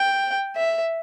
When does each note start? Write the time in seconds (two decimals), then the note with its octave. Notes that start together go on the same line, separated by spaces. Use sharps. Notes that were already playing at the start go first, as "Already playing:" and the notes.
Already playing: G5
0.56 E5